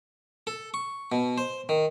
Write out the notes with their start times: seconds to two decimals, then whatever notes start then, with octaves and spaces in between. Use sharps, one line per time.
0.47 A4
0.74 C#6
1.12 B2
1.38 C5
1.69 D#3